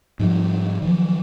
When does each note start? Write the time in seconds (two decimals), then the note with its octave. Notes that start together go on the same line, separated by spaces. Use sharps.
0.19 G#2 F3 G3
0.82 D#3 F3 F#3